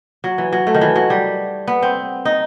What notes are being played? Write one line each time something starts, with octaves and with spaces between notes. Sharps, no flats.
F#3
E3
F#3
A3
D#3
E3
F#3
G3
B3
C4
D#4